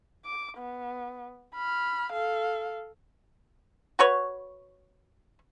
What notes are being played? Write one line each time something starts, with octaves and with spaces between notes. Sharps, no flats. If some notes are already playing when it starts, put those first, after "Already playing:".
D6
B3
B5 F6
A4 F5
F#4 B4 C#5